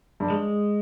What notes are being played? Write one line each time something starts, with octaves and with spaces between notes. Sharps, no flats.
G2
G#3